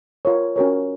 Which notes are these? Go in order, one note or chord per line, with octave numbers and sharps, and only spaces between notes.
F4 A#4 C#5
C#4 F#4 A#4 C#5